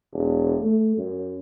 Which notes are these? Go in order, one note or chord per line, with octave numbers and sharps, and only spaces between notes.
E1
A3
F#2